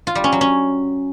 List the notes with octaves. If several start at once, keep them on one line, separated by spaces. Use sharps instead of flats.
F4
G3
C#4
F#3
C#4